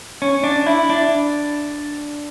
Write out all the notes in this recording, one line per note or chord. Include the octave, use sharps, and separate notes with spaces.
C#4
D4
E4
D4